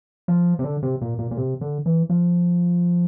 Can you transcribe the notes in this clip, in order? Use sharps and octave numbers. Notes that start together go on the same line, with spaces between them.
F3
C3
D3
C3
A#2
A#2
A#2
C3
D3
E3
F3